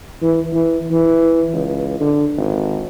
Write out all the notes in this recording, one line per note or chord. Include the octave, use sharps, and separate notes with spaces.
E3
E3
E3
C#2
D3
G#1